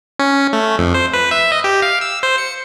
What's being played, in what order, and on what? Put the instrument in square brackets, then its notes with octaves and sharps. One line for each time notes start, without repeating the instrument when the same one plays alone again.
[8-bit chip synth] C#4
A3
F2
C5
B4
E5
D#5
G4
F5
E6
C5
C#7